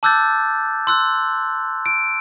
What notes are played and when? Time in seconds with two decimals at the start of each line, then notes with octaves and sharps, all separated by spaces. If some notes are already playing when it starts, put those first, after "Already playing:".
0.03 A5 D6 E6 F#6 G6 A6
0.87 C6 E6 F#6
1.86 D7